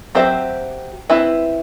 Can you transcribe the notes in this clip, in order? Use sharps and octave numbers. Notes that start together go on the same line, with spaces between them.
F#3 C4 G4 C5 E5
C4 E4 B4 E5